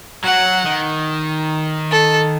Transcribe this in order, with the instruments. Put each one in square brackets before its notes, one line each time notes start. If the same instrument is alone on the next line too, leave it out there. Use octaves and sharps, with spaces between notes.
[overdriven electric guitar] F#3 [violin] F#5
[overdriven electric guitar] D#3
[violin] A4